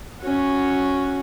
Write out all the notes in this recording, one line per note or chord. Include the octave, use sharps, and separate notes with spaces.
C#4 F#4